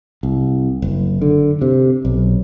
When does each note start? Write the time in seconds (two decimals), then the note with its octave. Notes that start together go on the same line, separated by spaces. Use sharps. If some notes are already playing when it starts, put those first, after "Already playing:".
0.23 C2
0.82 F#1
1.22 D3
1.62 C3
2.05 B1